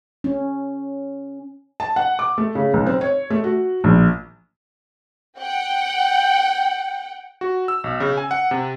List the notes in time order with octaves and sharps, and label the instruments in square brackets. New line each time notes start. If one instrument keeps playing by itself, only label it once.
[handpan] C#4
[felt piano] A5
F#5
D6
A3
C#3
B1
C4
C#5
A3
F#4
A#1
[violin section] F#5 G5
[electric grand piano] F#4
E6
B1
C#3
G#5
F#5
C3